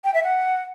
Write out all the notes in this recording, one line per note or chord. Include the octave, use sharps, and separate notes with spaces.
G5
E5
F#5